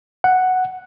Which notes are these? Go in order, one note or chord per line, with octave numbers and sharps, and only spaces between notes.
F#5